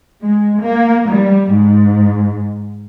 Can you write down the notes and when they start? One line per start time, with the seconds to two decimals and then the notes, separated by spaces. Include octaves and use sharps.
0.21 G#3
0.60 A#3
1.07 G3
1.50 G#2